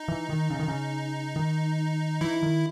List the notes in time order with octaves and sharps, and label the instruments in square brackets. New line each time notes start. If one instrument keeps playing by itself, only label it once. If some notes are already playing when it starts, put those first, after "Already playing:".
Already playing: [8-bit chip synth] D#4
[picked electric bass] E3
D#3
C#3
D#3
C#3
D#3
[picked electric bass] E3 [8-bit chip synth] E4
[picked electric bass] D#3